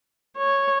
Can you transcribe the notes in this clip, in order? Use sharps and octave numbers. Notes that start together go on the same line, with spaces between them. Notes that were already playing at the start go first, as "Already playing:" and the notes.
C#5